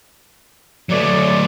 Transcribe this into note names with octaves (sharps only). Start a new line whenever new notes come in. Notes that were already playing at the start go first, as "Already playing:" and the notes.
F#3 A3 B4 C#5 D5